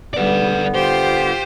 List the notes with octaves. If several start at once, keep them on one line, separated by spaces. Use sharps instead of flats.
D3 G3 B3 B4 D5
F4 G4 C5